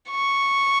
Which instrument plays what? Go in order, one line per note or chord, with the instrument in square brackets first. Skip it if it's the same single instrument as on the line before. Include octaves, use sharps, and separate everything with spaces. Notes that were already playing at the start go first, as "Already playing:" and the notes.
[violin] C#6